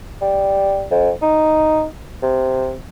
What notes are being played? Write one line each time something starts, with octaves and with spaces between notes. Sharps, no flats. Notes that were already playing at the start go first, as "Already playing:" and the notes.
G3
F2
D#4
C3